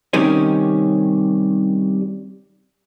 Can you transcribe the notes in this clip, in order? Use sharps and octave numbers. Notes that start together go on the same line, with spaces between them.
C3 D#3 G3 C#4